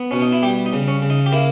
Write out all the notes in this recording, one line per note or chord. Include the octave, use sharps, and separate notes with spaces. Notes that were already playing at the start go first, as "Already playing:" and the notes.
Already playing: B3
B2 C#4
D#4
E4
G3 G4
D#4
C#3
C#4
C#3
D#4
G4
A#3 E4